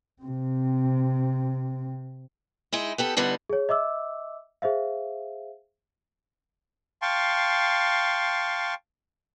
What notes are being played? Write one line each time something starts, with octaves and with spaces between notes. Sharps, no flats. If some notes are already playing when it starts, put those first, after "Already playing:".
C3 C4
G#3 D#4 E4
B3 G4 A4
E2 D3 G3 B3 D#4
G#4 C#5
D#5 E5 D6 E6
G#4 C5 E5 F5
F5 G5 A5 C6 C#6